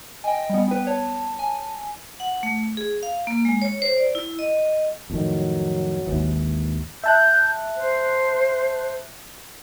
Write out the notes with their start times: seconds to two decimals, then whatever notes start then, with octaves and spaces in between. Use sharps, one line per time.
0.24 D#5 G5 G#5
0.50 G3 B3
0.68 B3 B4 G5
0.87 C#5 A5
1.39 G#5
2.20 F#5
2.43 A3
2.77 G#4
3.03 F5
3.27 A#3
3.45 G#3
3.62 C#5
3.82 C5
3.97 D5
4.15 E4
4.39 D#5
5.10 F2 A2 D#3 F#3
6.07 G#1 D#2 E3
7.04 E5 A5 F#6 G6
7.76 C5